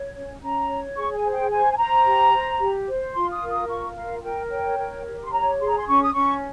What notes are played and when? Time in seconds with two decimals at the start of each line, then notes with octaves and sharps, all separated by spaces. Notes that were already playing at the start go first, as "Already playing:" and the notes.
Already playing: C#5
0.15 C#4
0.41 C#4 A#5
0.69 C#5
0.96 G#4 C#6
1.15 G#5
1.24 C5
1.32 G5
1.51 C5 G#5
1.72 G#5
1.78 C5 A#5
2.06 G4
2.33 C5
2.60 G4
2.87 C5
3.14 F4 C6
3.32 D#6
3.42 A#4
3.50 D#6
3.68 F4 C#6
3.96 A#4 F5
4.23 A#4 G5
4.50 C#5 G5
4.78 A#4
5.05 G4
5.23 C6
5.32 C#5 A#5
5.60 G#4 C6
5.68 A#5
5.77 C6
5.87 C#4 C#6
6.03 D#6
6.14 C#4 C#6